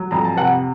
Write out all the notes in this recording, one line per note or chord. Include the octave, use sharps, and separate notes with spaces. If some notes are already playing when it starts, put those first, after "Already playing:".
Already playing: F#3
F2 A#5
A5
C3 F#5